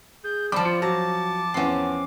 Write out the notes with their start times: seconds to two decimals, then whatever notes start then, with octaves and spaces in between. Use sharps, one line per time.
0.24 G#4 G6
0.52 F3 G3 C4 D5 A5 B5 D6
0.65 F4 C#7
0.82 F#3 A5 A#5 D6
1.54 E2 C4 C#4 F#5 C7